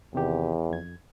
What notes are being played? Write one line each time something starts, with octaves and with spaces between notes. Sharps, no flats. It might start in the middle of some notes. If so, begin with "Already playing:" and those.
E2 C3 D#3 G4
F2 G#6